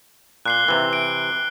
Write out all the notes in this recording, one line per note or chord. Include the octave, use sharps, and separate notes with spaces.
A#2 F#6 C7 G7
C3 E3
D7